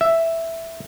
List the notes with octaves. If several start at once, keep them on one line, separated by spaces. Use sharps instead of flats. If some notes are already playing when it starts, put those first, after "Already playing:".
E5